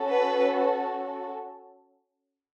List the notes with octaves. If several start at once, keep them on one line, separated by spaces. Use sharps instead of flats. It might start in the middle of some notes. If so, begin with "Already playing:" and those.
Already playing: C#4 F#4 A4
B4